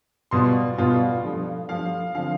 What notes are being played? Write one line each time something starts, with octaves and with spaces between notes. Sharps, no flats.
B2 G3 B3 F4 C6
B2 G3 B3 F4
G2 F3 A3
G2 F3 A3 F5
D3 F3 C4 F4 F5